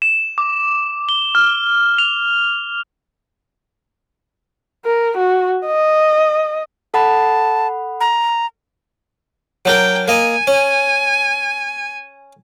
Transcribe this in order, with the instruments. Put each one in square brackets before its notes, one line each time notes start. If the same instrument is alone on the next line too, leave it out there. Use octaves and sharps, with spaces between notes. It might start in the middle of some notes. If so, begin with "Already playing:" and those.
[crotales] E7
D6
G7
F6
F7
[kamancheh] A#4
F#4
D#5
[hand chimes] A4 F#5 B5 [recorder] A5
[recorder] A#5
[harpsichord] F#3 D4 A#4 [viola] G5
[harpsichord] A#3 D#5 [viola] G#5
[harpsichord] C#4